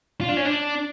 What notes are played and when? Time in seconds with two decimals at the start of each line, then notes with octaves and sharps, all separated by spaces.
0.21 F4
0.29 D4
0.37 C#4
0.45 D4